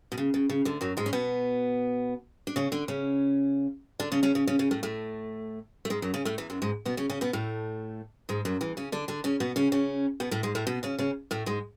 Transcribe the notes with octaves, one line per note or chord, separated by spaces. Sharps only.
B2
C#3
C#3
C#3
D2 D3
F#2 F#3
G#2 G#3
C#4
B2 B3
D4
C#3 C#4
D3 D4
C#3 C#4
D3 D4
C#3 C#4
C#3 C#4
C#3 C#4
C#3 C#4
C#3 C#4
A2 A3
A2 A3
A3
G#2 G#3
F#2 F#3
C#3 C#4
A2 A3
E2 E3
F#2 F#3
G#2 G#3
B2 B3
C#3 C#4
C#3 C#4
B2 B3
A2 A3
G#2 G#3
F#2 F#3
E2 E3
C#3 C#4
D3 D4
D3 D4
C#3 C#4
B2 B3
C#3 C#4
C#3 C#4
B2 B3
A2 A3
G#2 G#3
A2 A3
B2 B3
C#3 C#4
C#3 C#4
A2 A3
G#2 G#3